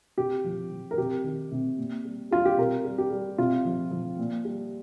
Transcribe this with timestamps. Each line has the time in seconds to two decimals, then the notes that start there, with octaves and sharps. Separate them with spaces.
0.18 C3 G4
0.44 F3
0.71 F3
0.91 A#4
0.98 C3 G4
1.24 D#3
1.52 C3
1.77 A#2
2.05 G3
2.31 G3 F4
2.45 G4
2.58 C3 A#4
2.85 G3
2.98 G4
3.11 G3
3.38 C3 F4
3.65 F3
3.91 F3
4.19 A#2
4.45 G3